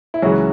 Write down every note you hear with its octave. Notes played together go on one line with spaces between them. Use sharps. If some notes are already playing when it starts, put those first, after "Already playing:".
E4
C#2 C#3 E3 F#3 F#4